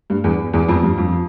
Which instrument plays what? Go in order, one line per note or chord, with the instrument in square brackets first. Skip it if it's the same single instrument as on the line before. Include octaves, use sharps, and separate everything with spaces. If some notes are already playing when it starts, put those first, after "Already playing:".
[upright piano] G2
E2
E2
F2
G2
F2